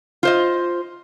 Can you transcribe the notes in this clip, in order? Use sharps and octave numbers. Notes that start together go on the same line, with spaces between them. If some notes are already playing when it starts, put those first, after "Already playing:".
F4 C5 D#5